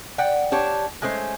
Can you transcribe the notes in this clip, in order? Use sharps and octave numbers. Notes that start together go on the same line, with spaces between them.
D5 F#5 G5
D4 G4 C#5
G#3 A3 C#4 C5